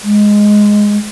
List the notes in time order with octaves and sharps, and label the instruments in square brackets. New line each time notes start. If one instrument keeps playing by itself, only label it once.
[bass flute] G#3